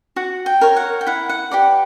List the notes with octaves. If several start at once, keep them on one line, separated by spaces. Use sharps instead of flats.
F#4 F#5
G5
A#4 C#5
F#5
G5
E4 F#5
F#5
G4 B4 D5 F#5